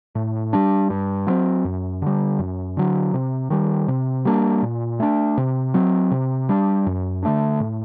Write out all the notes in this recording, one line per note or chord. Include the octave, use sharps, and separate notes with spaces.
A2
G3 D4
G2
F#3 C4
F#2
D3 G3
F#2
D3 F#3
C3
D#3 G3
C3
G3 A#3 D4
A#2
A3 D4
C3
F#3 C4
C3
G3 D4
F#2
D3 A3 D4
A2